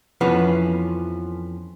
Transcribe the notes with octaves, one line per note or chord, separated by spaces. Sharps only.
F2 E3 F3 B3 C#4